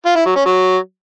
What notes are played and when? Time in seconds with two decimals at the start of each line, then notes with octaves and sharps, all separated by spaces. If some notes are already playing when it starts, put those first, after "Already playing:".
0.06 F4
0.16 E4
0.26 F#3
0.36 C#4
0.46 F#3